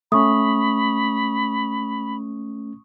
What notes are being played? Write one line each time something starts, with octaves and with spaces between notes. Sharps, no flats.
A3 C#4 B5 C#6 D#6